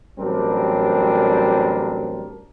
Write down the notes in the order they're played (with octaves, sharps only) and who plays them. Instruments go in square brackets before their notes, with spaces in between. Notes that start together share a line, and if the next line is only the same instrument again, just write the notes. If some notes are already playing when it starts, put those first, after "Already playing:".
[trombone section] A1 F#3 G3 C4 D4 A#4